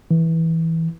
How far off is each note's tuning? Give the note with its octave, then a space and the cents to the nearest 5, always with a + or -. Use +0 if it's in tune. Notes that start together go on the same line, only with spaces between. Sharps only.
E3 -15